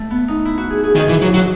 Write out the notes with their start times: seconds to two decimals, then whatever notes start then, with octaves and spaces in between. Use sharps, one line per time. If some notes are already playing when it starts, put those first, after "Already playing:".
Already playing: A3
0.11 B3
0.28 D#4
0.45 E4
0.58 F#4
0.70 G#4
0.84 G#4
0.96 D#3 G#4
1.09 E3
1.21 F#3
1.34 F#3